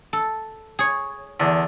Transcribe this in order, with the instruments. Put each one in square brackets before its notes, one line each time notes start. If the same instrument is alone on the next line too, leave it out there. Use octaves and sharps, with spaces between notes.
[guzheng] A4
G#4 C#5
[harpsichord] E2 D3